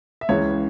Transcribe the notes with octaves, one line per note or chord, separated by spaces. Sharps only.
E5
C#2 C#3 E3 C#5